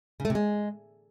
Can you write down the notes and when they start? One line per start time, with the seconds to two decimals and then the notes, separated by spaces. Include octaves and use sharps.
0.20 C#3
0.25 A3
0.30 C3
0.35 G#3